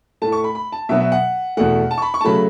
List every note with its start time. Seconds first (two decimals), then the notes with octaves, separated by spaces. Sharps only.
0.22 A2 A3 A5
0.32 C#6
0.44 B5
0.55 B5
0.72 A5
0.89 B2 F#3 B3 E5
1.01 E5
1.12 F#5
1.57 E2 B2 A3 F#5
1.91 A5
1.98 C#6
2.02 B5
2.14 C#6
2.21 A5
2.25 C#3 F#3 A3 B5